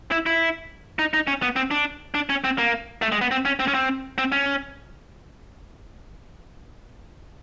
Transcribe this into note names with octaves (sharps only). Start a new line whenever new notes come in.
E4
E4
D#4
D#4
C#4
B3
C4
D4
D4
C#4
C4
A#3
A3
G#3
B3
C4
C#4
C4
C#4
C4
C4
C#4